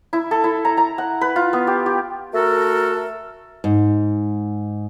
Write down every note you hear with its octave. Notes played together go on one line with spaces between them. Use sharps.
E4
A4
E4
A#5
A#5
F#5
B4
F4
B3
G4
G4
A3 F#4 A4 A#4
G#2